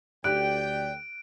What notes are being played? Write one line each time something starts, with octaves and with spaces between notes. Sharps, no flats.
D2 G4 D5 G5 F#6 D7